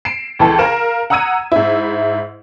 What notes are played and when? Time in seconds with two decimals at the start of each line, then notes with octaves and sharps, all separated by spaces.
0.05 C7 D7 E7
0.39 C#2 E3 A4 G5 A5
0.59 A#4 F5 E7
1.10 F#5 A#5 D#6 E6 G#6 D#7
1.52 G#2 E4